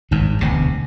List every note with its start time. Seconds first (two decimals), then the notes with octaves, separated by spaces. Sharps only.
0.11 G#1 G2 D#3
0.41 E1 D2 C3